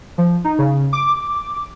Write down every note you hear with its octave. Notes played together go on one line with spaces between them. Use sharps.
F3
D#4
C#3
D6